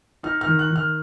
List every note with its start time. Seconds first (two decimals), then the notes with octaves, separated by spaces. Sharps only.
0.23 D#4 F6
0.41 F6
0.46 D#3
0.59 F#6
0.70 D#3
0.76 F6